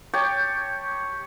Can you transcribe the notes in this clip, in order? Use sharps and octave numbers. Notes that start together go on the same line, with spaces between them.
G4 C#5 G5 A5